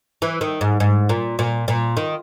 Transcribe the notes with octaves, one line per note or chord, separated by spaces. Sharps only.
E3
D#3
G#2
G#2
A#2
A#2
A#2
D#3